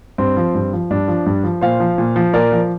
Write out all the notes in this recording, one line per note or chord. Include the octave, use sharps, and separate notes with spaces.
G2 C4
F3
G2
F3
G2 D4
F3
G2
F3
A#2 C5 F5
F3
A#2
F3
A#2 A#4 D5
F3